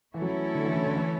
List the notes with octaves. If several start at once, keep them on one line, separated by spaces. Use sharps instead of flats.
E3 A3 C#4 E4 A4 C#5
F#3
E3
D3
E3
D3
D3
E3